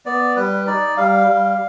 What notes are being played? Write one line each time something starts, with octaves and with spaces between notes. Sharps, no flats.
B3 D5
G3 B4
D#4 D5
G3 F5
G3